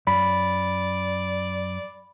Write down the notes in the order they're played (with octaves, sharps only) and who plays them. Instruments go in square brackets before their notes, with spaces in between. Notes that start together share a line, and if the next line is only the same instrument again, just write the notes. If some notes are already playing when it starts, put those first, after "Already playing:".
[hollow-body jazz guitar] F#2 [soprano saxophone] D5 [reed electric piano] B5